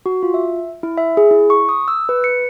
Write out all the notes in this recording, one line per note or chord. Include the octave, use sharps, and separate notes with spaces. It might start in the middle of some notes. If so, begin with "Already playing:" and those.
F#4
F4
E5
E4
E5
G#4
E4
C#6
D#6
E6
B4
C#7